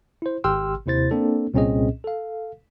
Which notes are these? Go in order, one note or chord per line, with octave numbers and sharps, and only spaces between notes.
E4 C5
G#1 G4 G5 C6 E6 F6
D#2 C3 E4 C5 A6
A#3 C4 D4 A4
C2 A#2 C4 C#4 G#4 D#5
A4 F5